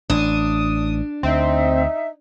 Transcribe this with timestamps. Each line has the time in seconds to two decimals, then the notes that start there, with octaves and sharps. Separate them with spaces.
0.10 A1 D4 D#6
1.23 D2 C4 D#4 E5